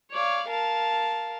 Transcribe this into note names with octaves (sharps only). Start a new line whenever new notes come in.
C#5 D5 F5
A#4 F5 A5